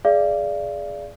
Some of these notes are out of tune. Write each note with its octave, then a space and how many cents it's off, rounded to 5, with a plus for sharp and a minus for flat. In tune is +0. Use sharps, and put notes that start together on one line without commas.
G#4 +5 D5 -5 F5 -40